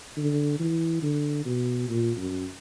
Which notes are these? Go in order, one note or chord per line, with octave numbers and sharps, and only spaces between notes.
D3
E3
D3
B2
A#2
F#2